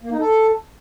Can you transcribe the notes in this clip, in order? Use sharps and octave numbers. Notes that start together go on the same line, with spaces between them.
A#3
D#4
A4